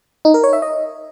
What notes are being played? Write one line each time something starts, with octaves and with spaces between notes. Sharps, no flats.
D#4
A#4
C#5
E5
D#5